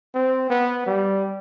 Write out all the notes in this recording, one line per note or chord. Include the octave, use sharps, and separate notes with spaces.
C4
B3
G3